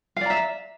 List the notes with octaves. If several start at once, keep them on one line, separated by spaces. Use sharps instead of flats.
D5 E5 F5 A#5